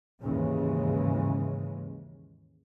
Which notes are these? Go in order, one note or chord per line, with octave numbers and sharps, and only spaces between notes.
D#2 G#2 C#3 E3 G#3 C#4